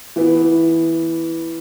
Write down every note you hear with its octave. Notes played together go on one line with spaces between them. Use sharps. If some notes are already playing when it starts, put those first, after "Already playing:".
E3 B3